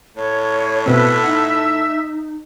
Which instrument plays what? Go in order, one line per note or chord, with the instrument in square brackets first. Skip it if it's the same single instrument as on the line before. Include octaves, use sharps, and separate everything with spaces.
[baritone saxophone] A2 [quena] C#5
[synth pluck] B2 C4 [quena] B4 [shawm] E5
[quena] D#4 [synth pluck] F#5